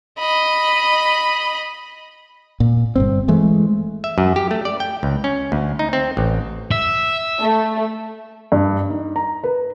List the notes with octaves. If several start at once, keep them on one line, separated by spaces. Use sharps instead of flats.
D#5 B5
A#2
G1 G2 C4
E3 G#3 A3
E5
F#2
G4
A3
D5
G5
C#2
C#4
D2
D#4
C4
A1
E5
A3
G2
D#4
A#5
B4